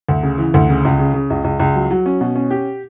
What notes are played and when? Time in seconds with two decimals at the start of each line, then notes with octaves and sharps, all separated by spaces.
0.09 D2
0.23 C#3
0.38 E3
0.54 D2
0.70 C#3
0.85 C#2
0.99 C#3
1.14 C#3
1.30 C#2
1.44 C#2
1.60 C#2
1.75 F#3
1.91 F#3
2.06 C#4
2.21 B2
2.35 C#4
2.51 G4